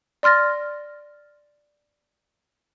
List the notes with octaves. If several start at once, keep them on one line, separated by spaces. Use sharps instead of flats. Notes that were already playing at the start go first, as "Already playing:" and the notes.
D5 C6 F6 A6 A#6